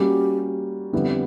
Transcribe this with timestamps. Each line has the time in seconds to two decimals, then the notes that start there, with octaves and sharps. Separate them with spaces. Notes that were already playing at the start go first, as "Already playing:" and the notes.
Already playing: G3 A#3 C#4 F#4 G4
0.93 F2 D3 G3 B3 E4